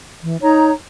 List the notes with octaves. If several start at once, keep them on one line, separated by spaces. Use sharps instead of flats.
E3
D#4 C#5 A#5